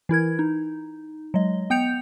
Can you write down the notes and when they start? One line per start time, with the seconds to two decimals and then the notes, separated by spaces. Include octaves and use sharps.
0.09 E3 E4 A#4 G#6
0.39 D#4
1.34 F#3 G#3 D#5
1.70 B3 G5 G6 C#7 F7